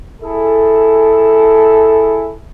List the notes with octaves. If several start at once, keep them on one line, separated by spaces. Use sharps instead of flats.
E4 G#4 A4